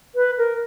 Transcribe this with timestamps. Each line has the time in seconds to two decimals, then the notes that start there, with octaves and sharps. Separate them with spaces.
0.15 B4
0.38 A#4